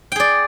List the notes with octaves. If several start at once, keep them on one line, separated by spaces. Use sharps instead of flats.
G#4 D5 G5